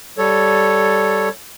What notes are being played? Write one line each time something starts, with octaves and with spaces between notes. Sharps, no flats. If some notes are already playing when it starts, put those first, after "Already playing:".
G3 A4 C#5